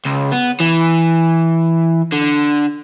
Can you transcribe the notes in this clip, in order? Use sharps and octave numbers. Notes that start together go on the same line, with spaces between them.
C#2
B3
E3
D3